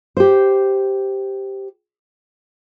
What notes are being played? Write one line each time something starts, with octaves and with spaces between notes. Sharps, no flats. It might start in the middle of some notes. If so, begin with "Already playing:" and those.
G4 C5